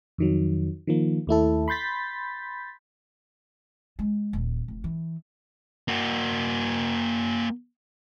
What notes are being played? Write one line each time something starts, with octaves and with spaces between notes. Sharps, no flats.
F2 D#3 F#3
D#3 F3 A#3
D#2 A3 E4 A4
B5 C6 G6 A6 B6
G#3
D#1
F1
E3
A#3 F#4